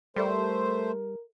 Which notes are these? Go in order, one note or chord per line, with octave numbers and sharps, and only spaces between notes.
G3 A3 A4 A#4 C5 D5 E5